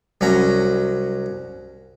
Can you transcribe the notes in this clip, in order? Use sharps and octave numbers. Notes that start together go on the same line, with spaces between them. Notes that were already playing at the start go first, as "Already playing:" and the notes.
C2 F#3 C#4 A#5 B5